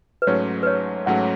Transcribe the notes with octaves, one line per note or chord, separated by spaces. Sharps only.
B4
G#2 F#3 A3 C#4 C#5
B4
C#5
G#2 F#3 A3 C#4 F#5